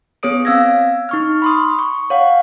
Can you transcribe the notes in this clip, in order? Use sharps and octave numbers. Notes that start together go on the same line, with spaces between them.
B3 G#4 C#5 D#6 D7
C4 F5 E6 G#6 A#6
D#4 C#6 F6
B5 C6 D#6
C#6
C#5 F5 F#5